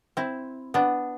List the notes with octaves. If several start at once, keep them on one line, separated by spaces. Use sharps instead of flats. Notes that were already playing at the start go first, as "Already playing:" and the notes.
C4 E4
B3 D4